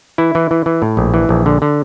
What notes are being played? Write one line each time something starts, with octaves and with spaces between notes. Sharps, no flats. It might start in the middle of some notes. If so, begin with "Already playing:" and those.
E3 E4
E3
E3
E3
A2
A#1
E3
A#1
D3
D3